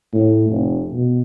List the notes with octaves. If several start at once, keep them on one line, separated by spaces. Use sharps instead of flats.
A2
F1
B2